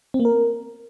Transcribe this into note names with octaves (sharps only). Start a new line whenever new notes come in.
C4
A#3
A#4